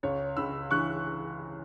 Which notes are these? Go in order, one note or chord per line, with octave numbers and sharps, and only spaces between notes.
C#2 C#5
C#2 B5 E6
E3 C#6 F#6